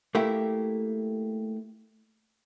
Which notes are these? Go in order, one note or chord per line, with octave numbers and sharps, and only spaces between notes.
A3 A#3 E4 G4